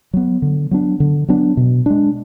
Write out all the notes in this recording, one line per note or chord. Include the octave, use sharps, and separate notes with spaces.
F#3 B3
D3
F#3 B3 D4
D3
F#3 B3 D4
B2
G#3 D4